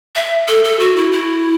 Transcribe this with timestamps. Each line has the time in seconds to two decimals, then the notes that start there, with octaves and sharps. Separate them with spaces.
0.15 E5
0.48 A4
0.64 A4
0.79 F#4
0.96 E4
1.12 E4